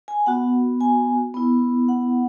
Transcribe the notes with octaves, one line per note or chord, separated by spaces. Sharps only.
G#5
B3 F#4 F#5
G#5
B3 E4
F#5